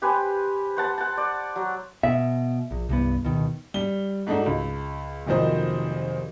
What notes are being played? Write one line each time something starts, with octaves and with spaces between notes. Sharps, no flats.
G4 B4 C5 G#5
C5 F#5 A5 C6
F#5 A5
D5
F#3
B2 E5
A#1
C2 G2 B3
D1 B2 D#3
G3 G7
G#2 A3 D4 D#4 F#4
C#2
F1 A#2 D#3 F#3 C5 D#5